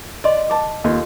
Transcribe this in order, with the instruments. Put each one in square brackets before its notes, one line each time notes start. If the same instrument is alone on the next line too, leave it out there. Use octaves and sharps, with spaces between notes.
[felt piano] D5 [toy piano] D#5 C6
[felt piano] A5 D6
[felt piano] D#2 F4 D#5 [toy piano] A4